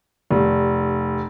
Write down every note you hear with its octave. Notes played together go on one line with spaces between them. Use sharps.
F1